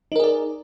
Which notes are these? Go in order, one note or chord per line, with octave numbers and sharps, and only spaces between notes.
D#4 G#4 A#4 D5